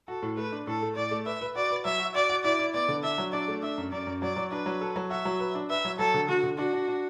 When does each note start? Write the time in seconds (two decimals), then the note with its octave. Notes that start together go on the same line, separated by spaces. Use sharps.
0.08 F#4 A4
0.23 A2
0.37 A3 B4
0.52 D4
0.67 A2 A4
0.82 A3
0.96 A2 D5
1.11 A3
1.26 B4 E5
1.41 B4
1.56 F#4 D5
1.71 B4
1.85 F#3 E5
2.00 F#4
2.15 F#4 D5
2.29 F#4
2.44 E4 D5
2.59 E4
2.74 B3 D5
2.89 D3
3.04 D4 E5
3.18 F#3
3.33 D4 D5
3.48 A3
3.63 D4 E5
3.78 F#2
3.92 F#2 D5
4.07 F#2
4.22 F#3 D5
4.36 F#3
4.52 D4 B4
4.66 F#3
4.81 A4
4.96 F#3
5.11 F#4 E5
5.25 F#3
5.40 B4
5.55 D4
5.70 B4 E5
5.85 F#3
5.99 F#3 A4
6.14 D3
6.29 D3 F#4
6.44 D3
6.58 D4 F#4
6.73 D4
6.88 D4